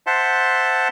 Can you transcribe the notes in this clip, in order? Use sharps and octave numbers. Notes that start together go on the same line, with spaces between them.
C5 E5 F#5 A5 C6